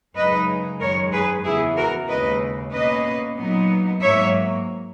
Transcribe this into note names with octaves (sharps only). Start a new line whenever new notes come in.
F#2 C#3 G#3 D#4 B4 D#5
F#2 D#3 G#3 A#4 C#5
G#4 B4
E2 C#3 E3 B3 E4 G#4
F#4 A#4
D#2 C#3 G#3 B4 D#5
B2 A#3 C#4 B4 D#5
A#2 F#3 B3 D#4
G#2 F#3 A#3 C#5 E5